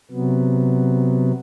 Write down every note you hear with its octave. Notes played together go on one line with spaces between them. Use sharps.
C3 F#3 B3